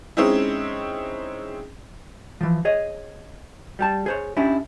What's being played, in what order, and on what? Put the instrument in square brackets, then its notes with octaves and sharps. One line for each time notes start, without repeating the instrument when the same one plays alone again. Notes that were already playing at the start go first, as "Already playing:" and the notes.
[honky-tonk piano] G#3 C4 C#4 D#4 E4
[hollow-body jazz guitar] E3 F3
G#4 C#5 D#5
G3 G4 A5
G#4 C5 C#5
C#4 D4 E4 G4